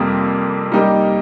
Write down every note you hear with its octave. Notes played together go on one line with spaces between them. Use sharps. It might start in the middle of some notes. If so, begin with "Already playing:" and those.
Already playing: F2 C3 G3 A#3
G3 A#3 D#4 G4